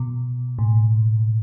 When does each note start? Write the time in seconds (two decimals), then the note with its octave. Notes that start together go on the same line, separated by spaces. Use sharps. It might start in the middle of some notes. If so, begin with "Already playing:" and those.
Already playing: B2
0.59 A2